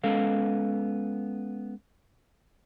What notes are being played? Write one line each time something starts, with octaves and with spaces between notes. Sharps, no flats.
G#3 B3 C#4 A4 F5